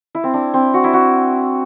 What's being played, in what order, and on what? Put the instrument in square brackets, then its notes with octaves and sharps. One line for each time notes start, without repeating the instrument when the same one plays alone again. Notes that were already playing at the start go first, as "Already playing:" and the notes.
[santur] E4
C4
D4
C4
F#4
E4
F#4